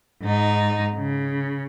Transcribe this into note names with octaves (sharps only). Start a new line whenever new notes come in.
G#2 D#4
C#3